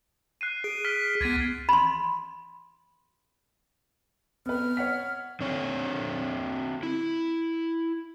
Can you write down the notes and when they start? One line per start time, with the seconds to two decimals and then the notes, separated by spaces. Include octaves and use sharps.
0.41 F#6 C7 D#7
0.64 G#4 D7
0.85 F6 B6 D#7
1.21 C#2 B3 G#6 A6 D#7
1.69 B5 C6
4.46 B3 B4 F6
4.77 C#5 F#5 B6
5.41 D3 C4 C#5
6.83 E4